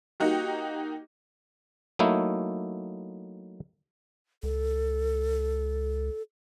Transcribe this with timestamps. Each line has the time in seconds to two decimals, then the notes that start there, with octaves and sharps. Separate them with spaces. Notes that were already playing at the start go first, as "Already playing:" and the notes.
0.20 A#3 D#4 F#4 G4
1.99 F#3 A3 A#3 D#4 E4
4.43 C#2 A4